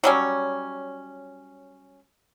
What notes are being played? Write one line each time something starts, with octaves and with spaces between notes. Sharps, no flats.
F#3 G3 C#4